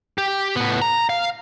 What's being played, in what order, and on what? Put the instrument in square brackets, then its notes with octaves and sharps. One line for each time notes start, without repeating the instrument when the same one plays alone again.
[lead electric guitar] G4
A2 B3
A#5
F5